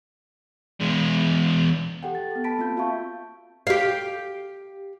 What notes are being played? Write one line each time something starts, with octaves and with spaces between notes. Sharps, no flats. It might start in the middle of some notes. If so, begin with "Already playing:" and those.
E2 G#3
G4 A4 F#5 G5
A6
B3 A4
A5 B5 B6 D7
A#3 C4 F4 G6
F4 F#4 E5 F5 A5 C#6
G4 F5